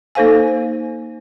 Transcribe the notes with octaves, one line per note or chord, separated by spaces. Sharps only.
A#3 D#4 A4 C5 F5 G#5